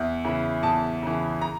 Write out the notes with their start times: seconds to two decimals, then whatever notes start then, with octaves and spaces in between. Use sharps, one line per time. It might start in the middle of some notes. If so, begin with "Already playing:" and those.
Already playing: E2 E5
0.24 C#3 E3
0.63 E2 A5
1.03 C#3 E3
1.41 A#5